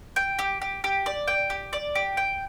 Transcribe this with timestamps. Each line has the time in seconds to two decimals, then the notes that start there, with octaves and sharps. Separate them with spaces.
0.16 G5
0.39 G4
0.62 G4
0.84 G4
1.06 D5
1.28 G5
1.50 G4
1.73 D5
1.95 G4
2.17 G5